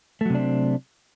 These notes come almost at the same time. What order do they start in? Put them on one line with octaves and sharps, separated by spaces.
A3 F#3 C3 D4 C4